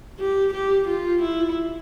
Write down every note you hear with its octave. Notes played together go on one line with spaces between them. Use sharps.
G4
G4
F4
E4